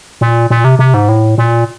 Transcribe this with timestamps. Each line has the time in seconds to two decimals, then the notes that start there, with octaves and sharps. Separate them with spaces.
0.21 A#2
0.50 A#2
0.64 C3
0.79 C3
0.94 G#2
1.09 A2
1.38 A#2